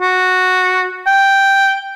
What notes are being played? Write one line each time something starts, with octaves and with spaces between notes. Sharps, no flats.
F#4
G5